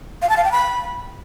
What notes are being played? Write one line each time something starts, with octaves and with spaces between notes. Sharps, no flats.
F5
A5
F5
G5
B5